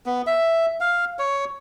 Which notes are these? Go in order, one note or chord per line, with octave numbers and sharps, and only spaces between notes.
B3
E5
F5
C#5